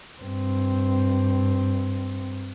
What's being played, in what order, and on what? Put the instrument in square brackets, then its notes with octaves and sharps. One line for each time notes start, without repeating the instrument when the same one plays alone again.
[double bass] G2 C4